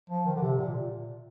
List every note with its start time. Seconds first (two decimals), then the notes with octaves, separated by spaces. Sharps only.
0.10 F3
0.25 D#3
0.36 D3
0.42 C3
0.59 A#2